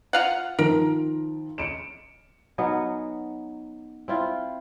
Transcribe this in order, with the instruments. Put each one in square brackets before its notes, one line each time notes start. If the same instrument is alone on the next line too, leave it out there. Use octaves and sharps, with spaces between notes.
[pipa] F4 F5 F#5
[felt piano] D#3 F3 [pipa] A#4
[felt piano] C#7 D7 E7
[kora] F#3 B3 C#4 D#4
C4 E4 F4